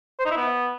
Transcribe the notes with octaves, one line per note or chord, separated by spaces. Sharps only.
C5
D#4
E4
B3